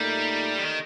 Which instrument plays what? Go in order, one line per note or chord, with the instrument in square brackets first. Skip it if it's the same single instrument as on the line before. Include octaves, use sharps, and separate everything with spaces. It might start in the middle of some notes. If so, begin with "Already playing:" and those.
Already playing: [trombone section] A#2 A3 D#4 [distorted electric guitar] G3
[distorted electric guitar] D#3